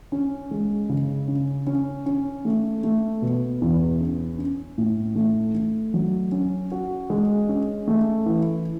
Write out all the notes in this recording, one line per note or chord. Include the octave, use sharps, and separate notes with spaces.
C#4
G#3
C#3
C#4
C#4
C#4
A3
A3
B2
E2
C#4
C#4
A2
A3
A3
F#3
C#4
F#4
G#3
C#4
A3
E3